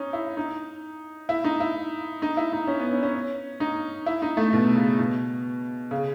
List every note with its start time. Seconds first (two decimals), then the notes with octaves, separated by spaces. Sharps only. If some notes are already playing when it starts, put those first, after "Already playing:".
Already playing: C#4 D#4
0.13 E4
0.37 D#4
1.29 E4
1.44 D#4
1.60 E4
2.22 D#4
2.37 E4
2.53 D#4
2.67 C#4
2.79 B3
2.91 C#4
3.03 C#4
3.60 D#4
4.06 E4
4.22 D#4
4.37 A3
4.53 B2
4.76 C#3
4.98 B2
5.91 C#3